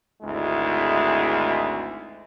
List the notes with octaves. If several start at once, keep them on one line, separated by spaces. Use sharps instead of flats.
G#1 D2 G#3 E4